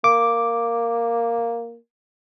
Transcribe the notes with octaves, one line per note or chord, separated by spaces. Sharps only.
A#3 D6